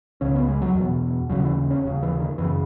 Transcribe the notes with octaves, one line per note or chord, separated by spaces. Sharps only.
C#2 C#3 C#4
B3
G#3
F#3
E2 B2
D#2 C#3 F#3
E3
C#4
D#2 C#3
E3
D#3
F#2 C#3 E3